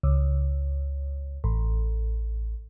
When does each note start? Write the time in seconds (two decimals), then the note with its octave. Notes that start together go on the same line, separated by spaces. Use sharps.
0.03 C#2
1.44 A1